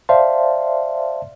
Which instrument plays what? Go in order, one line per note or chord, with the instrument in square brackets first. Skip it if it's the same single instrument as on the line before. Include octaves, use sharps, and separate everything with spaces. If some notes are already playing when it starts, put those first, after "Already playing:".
[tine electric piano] C5 D5 E5 F5 A5 C6